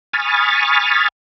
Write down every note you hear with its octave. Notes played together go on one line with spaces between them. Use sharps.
G#5 B5 C#6 D#6 F6 A6